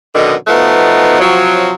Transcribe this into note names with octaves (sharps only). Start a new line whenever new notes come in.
F#2 B2 D3 D#3 D#5
B2 F3 A3 B3 D#4
C3 F3 F#3